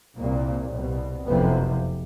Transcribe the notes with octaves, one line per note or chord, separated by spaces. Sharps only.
C2 A#2 A#3
C2 B2
F#1 F2 C3 B3